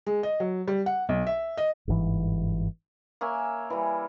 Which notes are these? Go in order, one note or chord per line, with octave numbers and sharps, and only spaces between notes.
G#3
D#5
F#3
G3
F#5
B1
E5
D#5
G1 G#2 B2 E3
A#3 C#5 E5 G#5
E3 G3